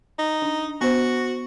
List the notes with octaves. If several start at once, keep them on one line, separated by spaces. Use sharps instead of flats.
D#4
D4
B3 F#4 C5